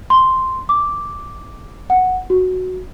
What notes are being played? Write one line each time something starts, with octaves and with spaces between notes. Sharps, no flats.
C6
D6
F#5
F#4